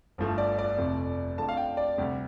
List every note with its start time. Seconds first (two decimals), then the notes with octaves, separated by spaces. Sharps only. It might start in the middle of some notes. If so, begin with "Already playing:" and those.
0.18 G1 G2 F3 A3
0.38 D5
0.58 D5
0.78 F1 F2 C3 A3
1.38 F2 D3 F3 A3 A5
1.49 F5
1.57 G5
1.77 D5
1.98 D2 C3 G3